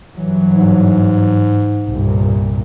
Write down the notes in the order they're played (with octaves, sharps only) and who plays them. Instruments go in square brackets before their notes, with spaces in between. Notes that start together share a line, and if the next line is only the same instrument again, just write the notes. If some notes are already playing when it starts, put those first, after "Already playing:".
[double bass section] G2 E3 F#3
[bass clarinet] G#2
[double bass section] C2 G2 A#2